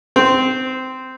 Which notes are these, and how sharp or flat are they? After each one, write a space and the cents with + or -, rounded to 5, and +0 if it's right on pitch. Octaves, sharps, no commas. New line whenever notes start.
C4 -15